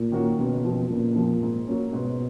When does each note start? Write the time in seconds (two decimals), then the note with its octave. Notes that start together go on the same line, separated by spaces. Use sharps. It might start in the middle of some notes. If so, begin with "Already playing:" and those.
Already playing: A#2
0.12 D#3 A#3 C#4 F#4
0.39 F#1 B2
0.65 F2 F3
0.90 F#1 A#2
1.16 F2 F3
1.42 G#2
1.67 F#3 A#3 C#4
1.93 G#2 B2